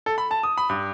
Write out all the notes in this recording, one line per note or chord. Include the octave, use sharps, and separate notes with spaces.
A4
B5
A5
D#6
B5
G2